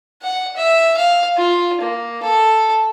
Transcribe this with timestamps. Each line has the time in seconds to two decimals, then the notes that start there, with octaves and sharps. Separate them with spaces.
0.22 F#5
0.57 E5
0.97 F5
1.37 F4
1.81 A#3
2.23 A4